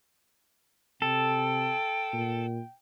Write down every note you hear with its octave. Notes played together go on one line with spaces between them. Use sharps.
C3 A4 G5
A#2